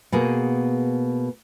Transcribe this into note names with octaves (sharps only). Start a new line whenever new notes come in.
B2 A#3 G#4